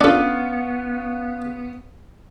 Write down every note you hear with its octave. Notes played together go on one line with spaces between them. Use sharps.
B3 C#4 D4 F4 A4